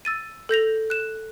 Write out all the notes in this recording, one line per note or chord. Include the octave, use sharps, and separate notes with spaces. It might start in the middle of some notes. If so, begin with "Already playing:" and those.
E6 A6 D#7
A4 G6 A#6 F7
F#6 E7